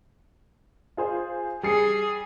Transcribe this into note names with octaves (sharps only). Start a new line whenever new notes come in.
F4 G#4 C5
G3 G#4 C7 C#7